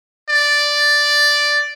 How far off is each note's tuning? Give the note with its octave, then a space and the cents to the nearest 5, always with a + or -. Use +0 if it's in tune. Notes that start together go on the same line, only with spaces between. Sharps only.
D5 +0